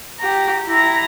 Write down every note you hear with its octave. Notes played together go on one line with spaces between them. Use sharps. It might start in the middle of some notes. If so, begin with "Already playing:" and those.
G4 A#5
E4 A#5